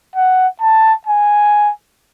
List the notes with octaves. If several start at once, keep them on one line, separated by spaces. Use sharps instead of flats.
F#5
A5
G#5